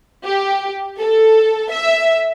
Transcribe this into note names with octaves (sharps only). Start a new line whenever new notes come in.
G4
A4
E5